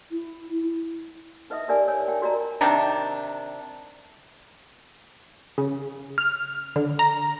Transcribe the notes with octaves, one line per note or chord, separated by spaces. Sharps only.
E4
D#4 B4 D#5 E5 D#6
D#4 G4 A#4 D5 G#5
A#4 C#5 G#5
D#4 G5
F#4 A#4 D5 D#5 A5 A#5
C3 D#3 D4
C#3
F6
D3
A#5